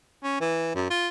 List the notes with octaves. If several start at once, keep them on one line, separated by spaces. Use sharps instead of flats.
C#4
E3
F#2
F4